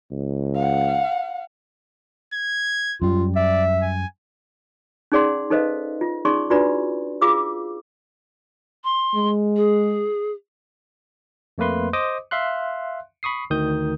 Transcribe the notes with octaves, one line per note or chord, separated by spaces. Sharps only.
C#2
F5 F#5
G#6
F#2 G3 F4
D5 E5
G#5
C#4 D#4 G#4 D5 F#5 C6
D#4 A4 B4 C5 D#5 F5
F4
C#4 D#4 G#4 D5 C6 C#6
D4 F4 F#4 B4 D5 B5
F4 G#4 F5 D6 E6
C6
G#3
G#4
F2 A3 A#3 B4 C6
C5 D#5 D6 D#6
E5 F5 C6 F#6
B5 C#6 D#6 C7
D2 D#3 D#6 G6